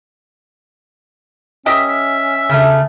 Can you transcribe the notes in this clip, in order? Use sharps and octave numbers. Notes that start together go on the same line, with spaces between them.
C#4 G4 A#4 D#5 E5
E5
C#3 A3